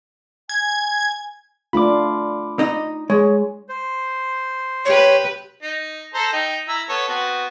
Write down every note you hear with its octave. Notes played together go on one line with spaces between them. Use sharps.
G#5 G#6
A3 D4 F4 B5 D6
D#4 D#5
G#3 C#5
C5
G4 B4 C#5
D#4
A4 C5 A#5
D#4 G5
E4 A#5 E6
B3 A4 C#5
B3 C4 F#4